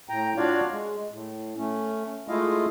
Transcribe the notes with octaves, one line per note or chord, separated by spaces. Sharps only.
A2 G5 A#5
D4 F4 F#4 C#5 D5 F5
G#3
A2
A3 C#4
G#3 A3 E4 F4 D#5 F5